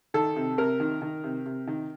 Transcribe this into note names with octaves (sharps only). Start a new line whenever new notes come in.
D#3 A4
C3
C3 A#4
D#3
D#3
C3
C3
D#3